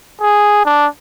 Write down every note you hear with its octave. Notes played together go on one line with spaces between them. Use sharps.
G#4
D4